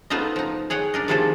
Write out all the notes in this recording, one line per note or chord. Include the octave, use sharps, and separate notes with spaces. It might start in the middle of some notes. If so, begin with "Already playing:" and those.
A3 B3 D#4 F4 C5 D#5
F3 D#4
G#4 C#5 F#5 G5
D4 A#4 D#5
C3 D#3 F3 A3 G#4 A4